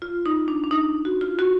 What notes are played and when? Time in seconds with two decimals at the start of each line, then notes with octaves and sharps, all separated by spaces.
0.02 F4
0.26 D#4
0.48 D4
0.64 D4
0.71 D#4
1.05 F#4
1.21 F4
1.39 F#4